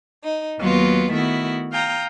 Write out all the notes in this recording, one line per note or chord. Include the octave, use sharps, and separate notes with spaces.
D#4
D#2 F#3 B3 F4 B4
D#3 A3 B3 E4 F#4
F5 G5 A#5 D#6